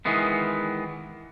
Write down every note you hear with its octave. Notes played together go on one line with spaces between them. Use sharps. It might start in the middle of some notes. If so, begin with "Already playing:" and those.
D#3 E3 G#3 B3